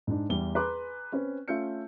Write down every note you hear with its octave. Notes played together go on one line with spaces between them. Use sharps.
G#2 D4
E2 G3 G7
G#4 B4 A#5 C6 D6 F#6
C4 C#4 B4
A3 C#4 F4 E5 G6 C#7